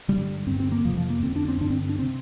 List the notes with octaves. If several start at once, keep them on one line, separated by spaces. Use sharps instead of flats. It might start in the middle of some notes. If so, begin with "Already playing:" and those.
G2 D3 G3
G2 D3 C4
C4
A#3
F2 C3 F3
F3
A#3
F2 D3 C4
D4
C4
G2 D3 D4
C4
D4
C3 C4